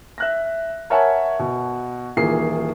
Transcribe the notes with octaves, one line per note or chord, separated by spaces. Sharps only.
E5 F#6 A#6
A#4 C#5 E5 F#5 G#5 A5
B2
D#1 E3 A#3 F4 G#4 C7